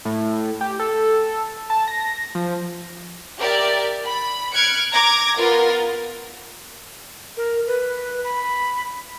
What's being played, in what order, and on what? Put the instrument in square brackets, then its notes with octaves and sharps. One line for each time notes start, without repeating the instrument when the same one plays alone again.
[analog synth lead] A2
G4
A4
A5
A#6
F3
[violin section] G4 A#4 D5 E5
B5
F6 F#6 G#6 C#7 D7
A#5 D6 G#6 A#6
B3 F4 A#4
[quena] A#4
B4
B5